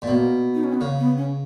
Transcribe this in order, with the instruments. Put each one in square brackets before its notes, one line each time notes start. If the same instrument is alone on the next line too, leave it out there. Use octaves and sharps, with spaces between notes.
[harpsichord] A#2
[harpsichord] B2 [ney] A#3
[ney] D#4
C#4
B3
[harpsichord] C#3 [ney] A#3
[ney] B3
C#4